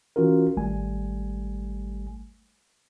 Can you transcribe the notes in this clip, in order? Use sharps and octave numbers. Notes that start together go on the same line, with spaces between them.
E3 C#4 F4 F#4 A#4
G#1 G3 A3 G#5